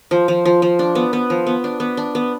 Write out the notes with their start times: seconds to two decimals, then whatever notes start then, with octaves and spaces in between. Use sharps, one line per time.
0.11 F3
0.28 F3
0.45 F3
0.62 F3
0.79 D4
0.95 B3
1.13 B3
1.30 F3
1.46 B3
1.64 D4
1.80 B3
1.97 D4
2.15 B3